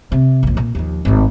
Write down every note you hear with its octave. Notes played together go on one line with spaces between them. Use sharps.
C3
A#1 F2
A#2
D#2 F3
G#1 A2